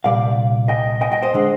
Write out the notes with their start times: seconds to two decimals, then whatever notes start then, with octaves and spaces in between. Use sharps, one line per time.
0.04 C2 A#2 G3 D5 F5
0.68 D#5 G5
1.01 D#5 G5
1.12 D#5 G5
1.22 C5 D#5
1.34 D3 G#3